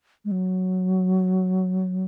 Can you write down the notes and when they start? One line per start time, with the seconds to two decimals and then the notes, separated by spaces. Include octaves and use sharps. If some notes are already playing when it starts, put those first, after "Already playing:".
0.25 G#3
0.31 F#3